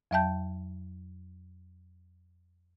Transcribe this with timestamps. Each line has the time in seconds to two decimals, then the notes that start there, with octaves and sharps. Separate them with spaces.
0.11 F2 F#3 E5 G5 A5 G6